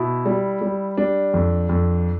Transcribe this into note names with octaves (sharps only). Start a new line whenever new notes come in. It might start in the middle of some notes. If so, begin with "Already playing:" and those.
Already playing: B2 E4
G3
G3
G3 D4
F2
F2